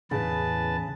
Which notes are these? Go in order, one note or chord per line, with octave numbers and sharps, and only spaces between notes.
E2 A2 C#3 B4 A5